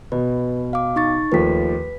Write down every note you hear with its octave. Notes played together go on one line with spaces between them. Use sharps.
B2 B4
F5 D6
D#4 C#6 A6
D#2 F3 A3 B4 B6